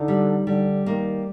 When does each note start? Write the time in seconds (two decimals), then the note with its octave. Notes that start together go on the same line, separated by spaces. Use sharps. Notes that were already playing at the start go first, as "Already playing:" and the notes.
Already playing: D3 D#4
0.08 G3
0.47 D3 G3
0.86 D#3 A#3